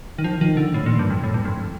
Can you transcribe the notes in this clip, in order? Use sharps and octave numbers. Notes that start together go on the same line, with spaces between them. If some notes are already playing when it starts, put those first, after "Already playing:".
D#3
F3
D#3
D3
A2
A#2
G2
F2
A2
G2
F2